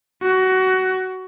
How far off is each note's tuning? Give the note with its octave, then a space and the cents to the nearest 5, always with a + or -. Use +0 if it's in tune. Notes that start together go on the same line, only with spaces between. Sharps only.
F#4 +20